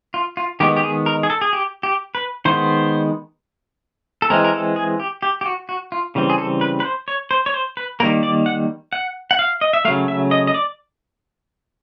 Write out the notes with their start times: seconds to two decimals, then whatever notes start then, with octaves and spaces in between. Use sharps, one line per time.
0.14 F4
0.37 F4
0.60 D#3 G#3 B3 G4
0.77 G4
0.83 G#4
1.06 A#4
1.23 G#4
1.30 A4
1.41 G#4
1.53 G4
1.83 G4
2.15 B4
2.45 D#3 G#3 B3 C5
4.22 A4
4.30 E3 G#3 C4 A#4
4.44 A#4
4.53 A4
4.76 G#4
5.00 G4
5.23 G4
5.41 G4
5.46 F#4
5.69 F#4
5.92 F4
6.15 C#3 E3 G3 C4
6.30 G#4
6.38 A4
6.61 B4
6.80 B4
6.85 C5
7.08 C#5
7.31 C5
7.46 C#5
7.54 C5
7.77 B4
8.00 D#3 G3 A#3 A#4
8.23 D5
8.46 F#5
8.93 F#5
9.31 F#5
9.39 F5
9.61 D#5
9.73 E5
9.85 C#3 F#3 A3 F5
10.08 E5
10.31 D#5
10.47 D#5
10.54 D5